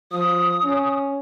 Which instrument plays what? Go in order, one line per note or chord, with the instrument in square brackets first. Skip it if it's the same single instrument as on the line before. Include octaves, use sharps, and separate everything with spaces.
[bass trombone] F3 [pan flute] D#6
[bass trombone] C#4